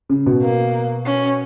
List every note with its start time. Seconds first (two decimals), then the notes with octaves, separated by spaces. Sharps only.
0.10 C#3
0.26 B2
0.42 A#3
1.06 C#4